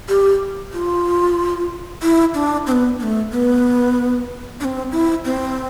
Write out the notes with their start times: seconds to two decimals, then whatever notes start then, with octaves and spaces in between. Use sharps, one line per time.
0.09 G4
0.73 F4
2.02 E4
2.35 D4
2.67 C4
2.72 B3
2.99 B3
3.03 A3
3.32 B3
4.61 D4
4.65 C4
4.92 E4
5.25 C4